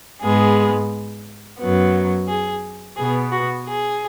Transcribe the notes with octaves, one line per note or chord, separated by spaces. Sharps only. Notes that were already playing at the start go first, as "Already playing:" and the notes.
G#2 G#3 B3 G#4
F#2 F#3 B3
G#4
B2 B3 G#4
F#4
G#4